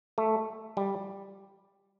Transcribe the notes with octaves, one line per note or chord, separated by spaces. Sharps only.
A3
G3